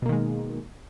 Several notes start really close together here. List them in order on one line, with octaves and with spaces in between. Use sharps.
B2 A#3 D#3 G#3